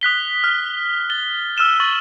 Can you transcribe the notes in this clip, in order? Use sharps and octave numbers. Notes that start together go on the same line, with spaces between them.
D#6 F#6 B6 G7
F6
A6 G7
E6 F6 D#7 E7 G7
C#6 A6 F#7